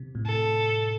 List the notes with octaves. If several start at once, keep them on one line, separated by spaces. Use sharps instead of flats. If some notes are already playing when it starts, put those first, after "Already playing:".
Already playing: C3
A2
A4